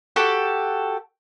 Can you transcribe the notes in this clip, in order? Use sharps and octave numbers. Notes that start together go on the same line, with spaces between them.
F#4 G4 A4